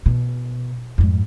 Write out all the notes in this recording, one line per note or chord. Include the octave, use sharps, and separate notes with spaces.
B2
F2 G#2